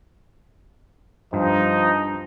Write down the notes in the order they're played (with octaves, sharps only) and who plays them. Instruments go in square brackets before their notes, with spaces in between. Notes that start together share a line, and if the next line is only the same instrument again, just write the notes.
[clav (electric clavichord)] G2 [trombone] F3 [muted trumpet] D#4